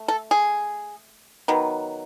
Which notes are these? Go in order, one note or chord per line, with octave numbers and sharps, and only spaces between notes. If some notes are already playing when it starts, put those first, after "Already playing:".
Already playing: A3
A4
G#4
D#3 F#3 B3